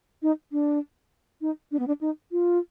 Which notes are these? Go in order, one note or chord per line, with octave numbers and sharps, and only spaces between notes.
D#4
D4
D#4
D4
B3
D4
D#4
F4